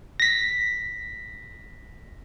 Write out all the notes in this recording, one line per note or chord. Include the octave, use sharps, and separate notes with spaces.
A#6 B6